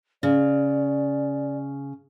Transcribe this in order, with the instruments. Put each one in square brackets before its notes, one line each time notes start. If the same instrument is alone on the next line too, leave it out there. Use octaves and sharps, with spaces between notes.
[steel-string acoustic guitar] C#3 [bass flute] D5